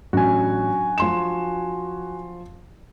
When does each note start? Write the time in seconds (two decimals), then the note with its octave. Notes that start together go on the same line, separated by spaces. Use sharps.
0.13 A1 F#3 D4 F#4 G#5
0.98 F3 C6 E7